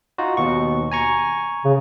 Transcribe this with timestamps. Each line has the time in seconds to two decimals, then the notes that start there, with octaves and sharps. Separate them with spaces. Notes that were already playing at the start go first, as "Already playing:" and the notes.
0.18 D#4 F4 F#4
0.37 D#2 B2 C#6
0.91 G#5 A#5 C#6
1.65 C#3